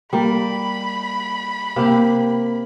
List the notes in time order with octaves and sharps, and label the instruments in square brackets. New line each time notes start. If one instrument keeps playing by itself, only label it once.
[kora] G3 A#3 [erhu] B5
[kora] C3 G4 [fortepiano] A#3